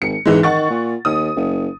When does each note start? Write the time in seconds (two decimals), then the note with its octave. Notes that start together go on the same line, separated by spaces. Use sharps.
0.02 G#1 C#7
0.26 B1 G#2 E3 G#3
0.43 D#3 F#5 C#6 A6
0.70 A#2
1.05 D#2 D#6
1.36 F#1